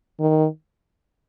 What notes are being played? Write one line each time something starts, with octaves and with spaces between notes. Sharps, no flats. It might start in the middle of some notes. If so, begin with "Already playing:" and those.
D#3